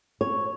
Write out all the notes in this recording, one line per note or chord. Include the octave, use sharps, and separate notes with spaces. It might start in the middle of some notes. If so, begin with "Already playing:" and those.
C#5